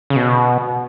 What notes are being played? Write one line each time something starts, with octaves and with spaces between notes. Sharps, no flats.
C#3
B2